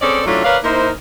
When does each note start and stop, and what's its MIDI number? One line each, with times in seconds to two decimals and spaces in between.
0.02 0.21 60
0.02 0.21 61
0.02 0.21 68
0.02 0.21 69
0.02 0.21 74
0.25 0.42 54
0.25 0.42 57
0.25 0.42 61
0.25 0.42 62
0.25 0.42 64
0.25 0.42 65
0.43 0.57 70
0.43 0.57 71
0.43 0.57 73
0.43 0.57 74
0.43 0.57 77
0.63 0.89 58
0.63 0.89 63
0.63 0.89 64
0.63 0.89 70
0.63 0.89 72